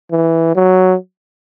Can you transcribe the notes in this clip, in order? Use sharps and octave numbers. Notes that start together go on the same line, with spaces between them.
E3
F#3